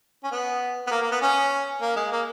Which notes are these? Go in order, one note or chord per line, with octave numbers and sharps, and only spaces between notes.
C#4
B3
B3
A#3
A#3
B3
C#4
A#3
G#3
A#3